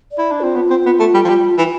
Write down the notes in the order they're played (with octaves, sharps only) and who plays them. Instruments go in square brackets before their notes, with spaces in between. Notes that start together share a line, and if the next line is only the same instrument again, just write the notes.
[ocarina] D5
[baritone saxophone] E4
D4
[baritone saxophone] C4 [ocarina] F4
[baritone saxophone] B3
C4
B3
A3
G3
F3
G3
[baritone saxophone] E3 [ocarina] F4